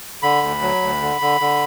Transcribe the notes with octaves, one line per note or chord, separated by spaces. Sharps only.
D3 B5
D2
F#3
D2
D3
D3
D3